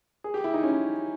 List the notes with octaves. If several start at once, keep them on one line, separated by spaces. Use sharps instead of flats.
G#4
G4
E4
D#4
C#4